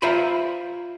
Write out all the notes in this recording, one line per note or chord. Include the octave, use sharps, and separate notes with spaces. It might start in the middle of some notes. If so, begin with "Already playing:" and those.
F4 C5 E5 G#5 A#5 B5